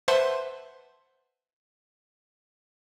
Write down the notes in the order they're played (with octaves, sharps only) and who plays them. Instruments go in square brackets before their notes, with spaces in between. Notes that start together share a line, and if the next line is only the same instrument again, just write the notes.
[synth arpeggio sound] B4 C5 E5 F#5 A5 C6